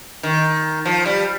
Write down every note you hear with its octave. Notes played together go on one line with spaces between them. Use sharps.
D#3
F3
G3